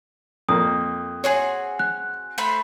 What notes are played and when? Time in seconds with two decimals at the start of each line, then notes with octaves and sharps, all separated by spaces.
0.49 F2 A#3 D#6
1.24 C4 F#4 G#4 C#5
1.79 F#6
2.38 A3 C5 B5